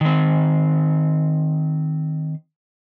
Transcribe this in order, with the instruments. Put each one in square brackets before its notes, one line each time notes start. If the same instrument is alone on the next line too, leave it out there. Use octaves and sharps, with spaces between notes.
[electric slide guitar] D#3 C4